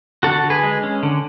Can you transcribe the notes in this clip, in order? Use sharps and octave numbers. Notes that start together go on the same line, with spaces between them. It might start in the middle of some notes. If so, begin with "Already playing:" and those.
D3 F#4 A4
D3
G#4 B4
G#3
C#4
D3